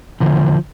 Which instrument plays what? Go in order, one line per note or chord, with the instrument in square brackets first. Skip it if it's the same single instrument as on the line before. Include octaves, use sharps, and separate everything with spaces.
[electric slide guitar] E2 D3 F3